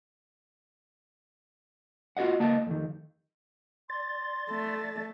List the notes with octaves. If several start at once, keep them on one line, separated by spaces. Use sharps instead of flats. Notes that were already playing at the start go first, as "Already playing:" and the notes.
F4 F#4 G#4 D#5 F#5
C#2 A#3 D#5 A5
F2 D#3
D5 C6 A6
A3